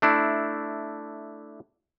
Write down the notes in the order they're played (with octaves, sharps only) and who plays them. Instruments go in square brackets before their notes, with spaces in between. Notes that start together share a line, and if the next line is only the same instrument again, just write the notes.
[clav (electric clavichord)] A3 D4 E4